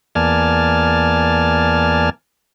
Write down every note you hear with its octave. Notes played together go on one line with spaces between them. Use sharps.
E2 A#3 D5 G#5 A5 F6